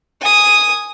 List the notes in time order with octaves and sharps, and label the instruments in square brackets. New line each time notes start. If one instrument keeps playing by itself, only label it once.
[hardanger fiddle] G#5 D#6